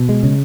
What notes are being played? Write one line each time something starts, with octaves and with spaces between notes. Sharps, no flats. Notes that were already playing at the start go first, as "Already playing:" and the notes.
Already playing: B2
G#3
C#3